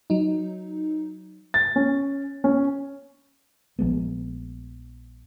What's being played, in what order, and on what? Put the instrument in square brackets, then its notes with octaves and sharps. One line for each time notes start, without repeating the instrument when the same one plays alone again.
[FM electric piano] F#3 D#4
[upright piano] A6
C#4
C#4
[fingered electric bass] A#1 F3 G#3 B3